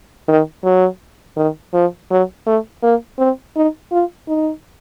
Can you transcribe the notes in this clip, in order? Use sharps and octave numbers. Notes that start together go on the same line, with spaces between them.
D#3
F#3
D#3
F3
F#3
A3
A#3
C4
D#4
F4
D#4